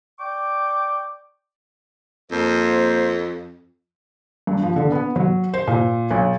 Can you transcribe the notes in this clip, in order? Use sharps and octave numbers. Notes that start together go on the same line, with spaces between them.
D5 G5 C#6 D6
F2 A#3 C5
G2
F3
D3
B3
F#3
C5
A#2
B1